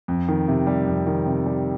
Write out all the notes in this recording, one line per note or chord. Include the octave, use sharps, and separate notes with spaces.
F2
D#3
C3
G3
F2
D#3
C3
G3